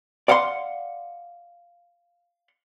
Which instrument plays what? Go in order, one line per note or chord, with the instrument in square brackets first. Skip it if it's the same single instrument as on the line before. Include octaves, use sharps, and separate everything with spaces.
[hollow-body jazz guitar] D5 F5 F#5 G#5 C6